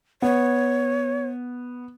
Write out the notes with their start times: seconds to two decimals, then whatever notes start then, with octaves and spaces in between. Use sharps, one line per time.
0.22 B3 C#5